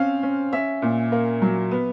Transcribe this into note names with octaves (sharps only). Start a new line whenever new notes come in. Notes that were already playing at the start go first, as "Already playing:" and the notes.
Already playing: C4 C#4 F5
C#4
C#4 E5
A#2
A#3
F#3
B3